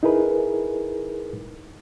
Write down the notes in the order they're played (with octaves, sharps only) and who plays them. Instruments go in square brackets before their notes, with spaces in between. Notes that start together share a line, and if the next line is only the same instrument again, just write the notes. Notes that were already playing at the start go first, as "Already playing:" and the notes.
[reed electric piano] D#4 E4 G#4 A#4 B4